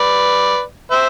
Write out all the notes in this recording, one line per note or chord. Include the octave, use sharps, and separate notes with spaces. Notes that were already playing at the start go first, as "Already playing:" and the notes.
Already playing: B4 D5
C5 E5